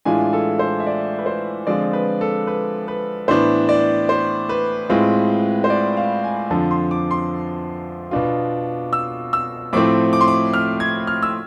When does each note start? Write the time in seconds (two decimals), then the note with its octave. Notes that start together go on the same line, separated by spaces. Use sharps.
0.05 A2 E3 G#3 D4 F4 G#5
0.33 A4
0.59 C5
0.80 E5
0.86 D5
1.19 B4
1.26 C5
1.67 D3 F3 G#3 C4 F4 D5
1.93 B4
2.21 A4
2.47 B4
2.88 B4
3.28 A2 E3 B3 D4 C5
3.69 D5
4.09 C5
4.49 B4
4.89 A2 G#3 C4 F4
5.64 C5
5.70 D5
5.97 F5
6.24 G#5
6.50 F2 D3 F3 A5
6.71 C6
6.91 D6
7.11 C6
8.11 B2 B3 D4 F4
8.93 E6
9.33 E6
9.73 A2 F3 A3 C4 D6
10.13 D6
10.21 C6
10.28 D6
10.54 F6
10.80 G#6
11.07 F6
11.22 E6